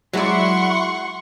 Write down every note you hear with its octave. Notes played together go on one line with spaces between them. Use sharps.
F#3 G#3 E4 F#4 D5 F#5 C6 C#6